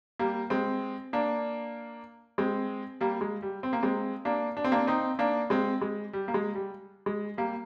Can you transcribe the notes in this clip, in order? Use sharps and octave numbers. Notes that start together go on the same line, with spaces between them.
G3 A#3
G#3 C4
A#3 D4
G#3 C4
G3 A#3
G#3
G3
C4
A#3
G#3 C4
A#3 D4
D4
C4
A#3 D4
C4 D#4
A#3 D4
G#3 C4
G#3
G3
A#3
G#3
G3
G#3
G3 A#3